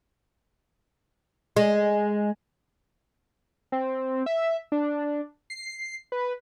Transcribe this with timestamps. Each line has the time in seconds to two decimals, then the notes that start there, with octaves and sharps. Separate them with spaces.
1.56 G#3
3.72 C4
4.26 E5
4.72 D4
5.50 C7
6.12 B4